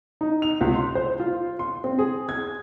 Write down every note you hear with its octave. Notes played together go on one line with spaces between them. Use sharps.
D#4
F7
C#2
C6
C5
F4
C6
C4
G#4
G#6